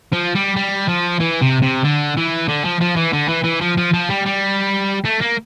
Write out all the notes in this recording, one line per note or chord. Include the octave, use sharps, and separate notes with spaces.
F3
G3
G3
F3
E3
C3
C3
D3
E3
D3
F3
F3
E3
D3
E3
E3
F3
F3
F3
G3
G3
A3
A#3